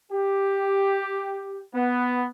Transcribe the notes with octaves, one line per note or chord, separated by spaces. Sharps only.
G4
B3